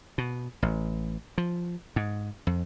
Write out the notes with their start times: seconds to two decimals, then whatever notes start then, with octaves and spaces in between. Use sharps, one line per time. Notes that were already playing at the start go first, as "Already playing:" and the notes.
0.18 B2
0.62 A1
1.38 F3
1.96 G#2
2.47 F2